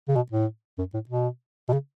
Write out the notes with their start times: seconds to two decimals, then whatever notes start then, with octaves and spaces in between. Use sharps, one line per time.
0.08 C#3
0.15 B2
0.32 A2
0.78 F#2
0.94 A2
1.09 B2
1.68 B2
1.73 C#3